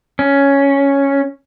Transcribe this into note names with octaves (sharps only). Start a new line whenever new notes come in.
C#4